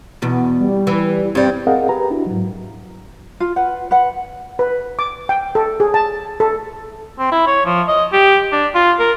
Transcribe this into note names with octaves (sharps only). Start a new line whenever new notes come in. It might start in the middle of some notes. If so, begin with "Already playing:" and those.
E2 B2
G3
E3
G2 G3 C4
C4 G#4 A#4 D#5 F5 F#5
G4 B4 A#5
D4 E4 F#4
G#2 F#3
F4
B4 F#5
B4 F#5
B4
D6
G5
A4
G#4
A5
A4
C4
E4
C#5
F3
D#5
G4
D4
F4
A#4